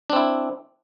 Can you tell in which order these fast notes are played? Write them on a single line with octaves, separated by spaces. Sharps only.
D4 C4 E4